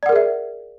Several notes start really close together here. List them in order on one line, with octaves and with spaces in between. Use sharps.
D5 F#5 A#4 G#4 E5